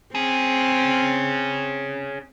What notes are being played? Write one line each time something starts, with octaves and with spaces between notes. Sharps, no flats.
C4 C#4 G#4